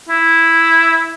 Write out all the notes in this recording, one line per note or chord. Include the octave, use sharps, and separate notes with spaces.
E4